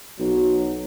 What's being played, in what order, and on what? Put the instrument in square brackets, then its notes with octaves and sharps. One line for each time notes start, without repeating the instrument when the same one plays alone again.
[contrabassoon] B1 [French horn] F#3